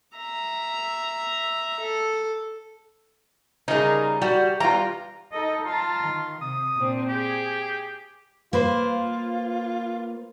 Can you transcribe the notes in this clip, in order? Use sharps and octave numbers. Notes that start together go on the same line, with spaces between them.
E5 A#5
A4
C#3 G3 D#4 G#4 A#4
G3 F#4
G3 B3 F4 A#5
D#4 A4 D#5
F4 A5 A#5
D#3
C3 D#6
A#2 C4 D4
G4 G#4
A#3 F4 B4 C5